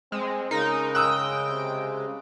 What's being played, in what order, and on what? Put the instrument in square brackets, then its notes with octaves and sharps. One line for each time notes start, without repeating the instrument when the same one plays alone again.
[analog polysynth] G#3 [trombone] C4
[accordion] C#3 G#3 [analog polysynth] D#4 [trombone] A#4
[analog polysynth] G5 [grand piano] D#6 E6 F#6
[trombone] C3